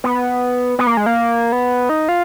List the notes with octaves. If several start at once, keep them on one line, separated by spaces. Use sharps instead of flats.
B3
B3
A#3
G#3
A#3
B3
D#4
F4